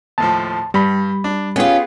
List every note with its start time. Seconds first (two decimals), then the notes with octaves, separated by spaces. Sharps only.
0.18 D#2 A2 F3 A5
0.74 G2 G3 B5
1.24 D4
1.56 B3 C#4 F4 G4 G#4